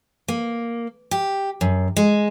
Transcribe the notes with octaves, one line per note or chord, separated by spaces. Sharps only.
A#3
G4
F#2
G#3